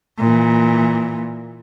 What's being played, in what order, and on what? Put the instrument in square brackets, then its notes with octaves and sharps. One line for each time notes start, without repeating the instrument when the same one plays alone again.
[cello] A#2 E3